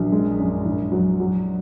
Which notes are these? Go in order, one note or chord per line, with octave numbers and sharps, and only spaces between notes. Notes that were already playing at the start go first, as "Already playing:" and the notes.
Already playing: A#1 F#3
G#3
F#2
A#1
F#3
F#3